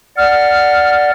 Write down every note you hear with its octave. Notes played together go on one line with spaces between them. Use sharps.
D5 F#5 F6